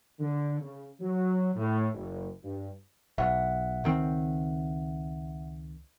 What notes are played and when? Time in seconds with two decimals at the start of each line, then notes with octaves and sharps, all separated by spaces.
0.19 D3
0.60 C#3
1.00 F#3
1.55 A2
1.94 F#1
2.43 G2
3.18 B1 E5 F#5
3.84 C#2 D#3 C4